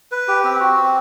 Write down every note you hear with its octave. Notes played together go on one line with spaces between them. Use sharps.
B4
G4
C4
F#4
C4